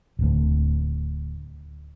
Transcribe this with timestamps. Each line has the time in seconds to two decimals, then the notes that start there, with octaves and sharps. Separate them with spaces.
0.19 D1 D2